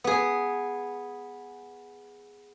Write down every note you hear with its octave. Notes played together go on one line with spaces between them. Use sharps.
B3 G#4